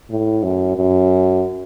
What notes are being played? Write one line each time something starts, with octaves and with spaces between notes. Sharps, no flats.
A2
F#2
F#2